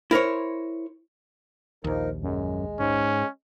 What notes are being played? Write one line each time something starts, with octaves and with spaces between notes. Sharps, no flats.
E4 A#4 C5 C#5
A#1 D#2 F3 D#4 A#4
F#2 G#3
G#2 C#4